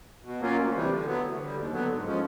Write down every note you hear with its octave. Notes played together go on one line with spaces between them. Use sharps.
B2
F#3 A#3 C#4 F4
D2
C3 E3 G3
D3
F#3 B3
D2
D3 G3
D#2
D3 F#3 B3
G#2
F3 G#3 C#4